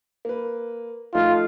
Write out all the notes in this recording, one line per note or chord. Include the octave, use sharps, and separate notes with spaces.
A#3 B4
F3 A3 D#4 F4